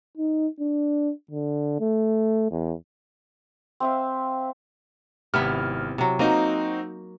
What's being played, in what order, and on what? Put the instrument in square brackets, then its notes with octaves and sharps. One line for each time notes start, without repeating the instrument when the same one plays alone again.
[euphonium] D#4
D4
D3
A3
E2
[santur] C4 E5 F5
[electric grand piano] G#1 F6 [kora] C3 B3 E4
[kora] C3 F#3
[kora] A#3 D#5 [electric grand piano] C4 D#4 F#4